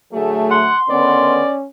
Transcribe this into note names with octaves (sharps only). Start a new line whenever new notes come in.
D3 F#3 A3 G#4
F#5 C6
D3 D#3 B3 C#4 D5